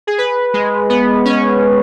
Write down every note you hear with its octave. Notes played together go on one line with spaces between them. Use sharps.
G#4
B4
G#3
B3
C#4